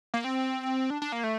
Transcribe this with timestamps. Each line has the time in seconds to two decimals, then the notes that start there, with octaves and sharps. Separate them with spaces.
0.14 A#3
0.24 C4
0.90 D4
1.02 D4
1.12 A#3
1.24 A3